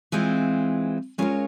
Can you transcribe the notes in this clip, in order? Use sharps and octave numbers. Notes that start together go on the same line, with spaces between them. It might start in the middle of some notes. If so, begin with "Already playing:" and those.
E3 G#3 C4 F4
G#3 C#4 F4 A#4 C#5